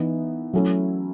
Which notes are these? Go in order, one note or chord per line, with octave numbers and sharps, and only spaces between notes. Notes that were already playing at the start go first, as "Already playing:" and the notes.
Already playing: E3 B3 D#4
F#3 A3 C#4 E4